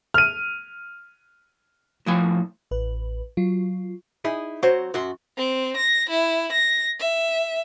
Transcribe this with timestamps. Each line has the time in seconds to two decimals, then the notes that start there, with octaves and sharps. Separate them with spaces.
0.14 F6 D#7
2.06 A2 F3 G#5
2.71 A1 B4
3.37 F#3 F4
4.25 D#4 E4 G#4
4.63 F#3 C4 F#4 C5 C#5
4.94 F#2 F#4 C6
5.37 C4
5.77 A#6
6.09 E4
6.52 A#6
6.99 E5